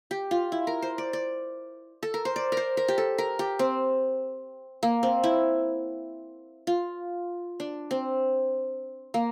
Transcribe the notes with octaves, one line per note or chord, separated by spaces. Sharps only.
G4
F4
E4
A#4
C5
D5
D5
A4
A#4
C5
D5
A#4
C5
A#4
G4
A4
A#4
G4
C4
A#3
C4
E4
F4
D4
C4
A#3